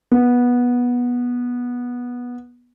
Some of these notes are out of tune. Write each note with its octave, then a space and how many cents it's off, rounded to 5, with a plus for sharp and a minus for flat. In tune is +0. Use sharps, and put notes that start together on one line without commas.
B3 -15